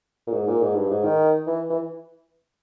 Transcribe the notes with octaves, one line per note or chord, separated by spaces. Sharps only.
A#2
G#2
A#2
G#2
G2
G#2
D#3
E3
E3